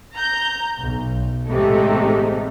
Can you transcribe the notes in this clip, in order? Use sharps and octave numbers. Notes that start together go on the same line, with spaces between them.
A#5 G6
B1
A1 C3 G#3 A3 D#4 A4